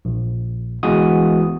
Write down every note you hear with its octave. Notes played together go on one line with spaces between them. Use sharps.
A#1
G1 E3 G#3 B3 F#4 D#6